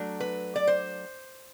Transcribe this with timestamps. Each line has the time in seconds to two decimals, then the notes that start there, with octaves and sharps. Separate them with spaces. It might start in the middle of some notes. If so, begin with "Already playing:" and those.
Already playing: F#3 A3 D4
0.20 B4
0.56 D5
0.67 C5